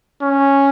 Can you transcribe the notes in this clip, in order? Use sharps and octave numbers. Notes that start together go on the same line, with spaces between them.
C#4